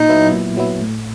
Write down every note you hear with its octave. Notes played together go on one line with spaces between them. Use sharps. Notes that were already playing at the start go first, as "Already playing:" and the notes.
Already playing: A#2 D#4
F#3 B3 E4
A#2
F#3 B3 E4
A2